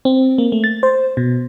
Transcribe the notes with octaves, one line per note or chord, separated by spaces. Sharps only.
C4
A#3
A3
A6
C5
B2